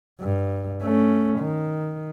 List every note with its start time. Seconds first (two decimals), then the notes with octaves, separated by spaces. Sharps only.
0.21 G2
0.82 A3 C#4
1.39 D#3